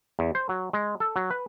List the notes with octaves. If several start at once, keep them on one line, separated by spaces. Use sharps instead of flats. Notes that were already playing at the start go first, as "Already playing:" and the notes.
E2
C5
F#3
G#3
A4
F#3
B4